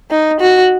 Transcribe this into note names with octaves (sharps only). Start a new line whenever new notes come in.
D#4
F#4